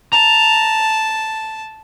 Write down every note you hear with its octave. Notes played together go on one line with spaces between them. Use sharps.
A5 A#5